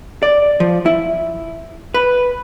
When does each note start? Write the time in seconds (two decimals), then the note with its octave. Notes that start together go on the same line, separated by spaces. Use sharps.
0.23 D5
0.60 F3
0.86 E4
1.94 B4